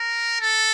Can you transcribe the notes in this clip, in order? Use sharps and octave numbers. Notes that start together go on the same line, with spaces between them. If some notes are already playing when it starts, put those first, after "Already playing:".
Already playing: A#4
A4